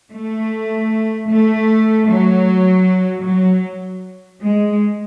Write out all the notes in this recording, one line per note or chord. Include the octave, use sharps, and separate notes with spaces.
A3
A3
F#3
F#3
G#3